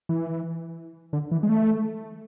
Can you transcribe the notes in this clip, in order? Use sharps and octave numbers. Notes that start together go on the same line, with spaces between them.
E3
D3
E3
G#3
A3